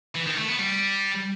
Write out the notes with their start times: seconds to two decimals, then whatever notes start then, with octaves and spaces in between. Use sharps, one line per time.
0.15 E3
0.26 D#3
0.37 A3
0.48 B3
0.59 G3